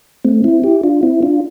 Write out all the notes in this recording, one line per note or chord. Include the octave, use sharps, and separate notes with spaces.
A3 C4
C4 E4
E4 G4
D4 F4
C4 E4
D4 F4